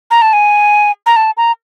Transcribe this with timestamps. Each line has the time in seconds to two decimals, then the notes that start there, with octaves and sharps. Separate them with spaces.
0.11 A#5
0.22 A5
0.33 G#5
1.06 A#5
1.16 A5
1.37 A#5